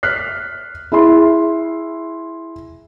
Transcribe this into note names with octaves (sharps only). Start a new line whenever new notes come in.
F6 F#6 B6 C7
E4 G#4 E5 C6